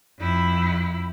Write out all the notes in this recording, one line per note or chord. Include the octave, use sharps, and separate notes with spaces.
F2 E4